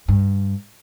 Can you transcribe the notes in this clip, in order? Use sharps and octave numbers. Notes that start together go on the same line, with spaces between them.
G2